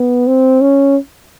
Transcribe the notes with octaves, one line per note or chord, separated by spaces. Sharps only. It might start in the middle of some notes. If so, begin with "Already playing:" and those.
Already playing: B3
C4
C#4